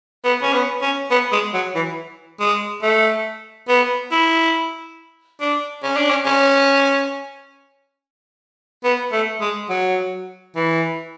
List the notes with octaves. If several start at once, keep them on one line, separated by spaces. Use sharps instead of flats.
B3
C#4
B3
C#4
B3
G#3
F#3
E3
G#3
A3
B3
E4
D4
C#4
D4
C#4
C#4
B3
A3
G#3
F#3
E3